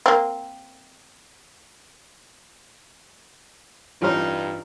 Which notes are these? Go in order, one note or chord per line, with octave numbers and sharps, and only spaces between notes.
A#3 C4
A1 G2 G3 D#4 F4 C5 F6